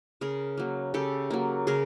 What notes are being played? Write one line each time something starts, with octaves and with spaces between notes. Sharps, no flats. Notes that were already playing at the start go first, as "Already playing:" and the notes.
C#3 G#4 A#4
F#3 A#3
C#3 G4 A4
F#3 A#3
C#3 G#4 A#4